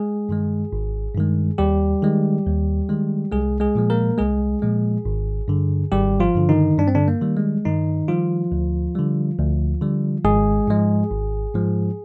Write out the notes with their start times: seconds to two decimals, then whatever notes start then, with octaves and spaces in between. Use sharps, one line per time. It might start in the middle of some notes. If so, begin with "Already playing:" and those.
Already playing: G#3 G#4
0.29 G2 D#3 G#3
0.72 G#1
1.15 G2 D#3 G#3
1.58 D#2 G3 G4
2.03 D#3 G#3
2.46 D#2
2.89 D#3 G#3
3.31 C2 G#3 G#4
3.60 G#3 G#4
3.75 A#2 F3 G#3
3.90 A#3 A#4
4.18 C2 G#3 G#4
4.62 A#2 F3 G#3
5.05 G#1
5.48 G2 D3
5.92 G#1 G3 G4
6.20 F3 F4
6.34 G2 D3
6.49 D#3 D#4
6.78 G2 D4
6.88 C4
6.95 D3 D4
7.08 A#3
7.21 D#3 G3
7.37 G#3
7.65 G2 D#3 D#4
8.08 D#3 F3 G3 F4
8.52 D2
8.95 D3 G3
9.39 D2
9.81 D3 G3
10.24 G#1 G#3 G#4
10.67 G#2 F3 G#3
11.11 G#1
11.54 G#2 F3 G#3